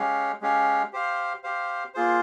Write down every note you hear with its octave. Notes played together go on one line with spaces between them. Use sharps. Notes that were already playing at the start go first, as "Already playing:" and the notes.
Already playing: G#3 C#4 G4 C#5 F5
G#3 C#4 G4 C#5 F5
G4 C5 F5
G4 C5 F5
A#3 F4 G#4 C5